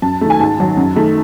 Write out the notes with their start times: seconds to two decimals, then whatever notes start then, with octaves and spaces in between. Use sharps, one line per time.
0.02 F#2 A5
0.21 D#3 A3
0.30 G#5
0.40 G#2 A5
0.59 D#3 F#3
0.77 F#2
0.96 D#3 A3